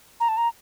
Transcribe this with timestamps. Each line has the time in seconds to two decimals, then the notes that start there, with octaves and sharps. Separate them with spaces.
0.20 A#5
0.29 A5
0.37 A#5